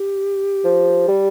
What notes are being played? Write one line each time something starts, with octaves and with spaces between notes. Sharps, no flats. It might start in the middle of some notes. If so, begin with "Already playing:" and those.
Already playing: G4
F3
G3